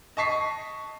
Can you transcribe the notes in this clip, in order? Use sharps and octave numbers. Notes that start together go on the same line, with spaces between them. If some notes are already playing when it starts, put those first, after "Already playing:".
D#5 A5 C#6 B6 C7